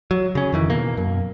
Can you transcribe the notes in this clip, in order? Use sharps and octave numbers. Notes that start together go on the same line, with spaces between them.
F#3
C#3 C#4
F2 D#3 E3
B2 A#3
F#2